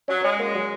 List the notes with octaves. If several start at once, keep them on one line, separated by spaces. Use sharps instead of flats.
F#3 C#4
G#3 C#4
A#3
F#3